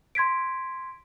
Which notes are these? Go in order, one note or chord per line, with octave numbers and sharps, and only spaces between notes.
C6 G#6 B6 D7